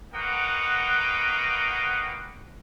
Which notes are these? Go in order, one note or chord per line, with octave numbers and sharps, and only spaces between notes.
A#3 D#4 F#4 B4 F#5 G5